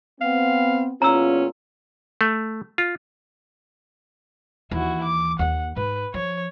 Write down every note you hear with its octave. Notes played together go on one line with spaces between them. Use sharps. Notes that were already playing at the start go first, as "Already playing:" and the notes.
B3 C4 F5
E2 A#2 C#4 F4 A#5 E6
A3
F4
D#2 E3 E4 F#4
D6
D#2 A#3 F#5
G#2 B4
F3 C#5